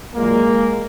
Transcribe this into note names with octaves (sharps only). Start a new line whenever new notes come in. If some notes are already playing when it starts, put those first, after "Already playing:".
A#2 F#3 G#3 A#3